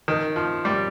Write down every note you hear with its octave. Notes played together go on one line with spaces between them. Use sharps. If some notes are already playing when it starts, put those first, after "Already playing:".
D#3
F3
G3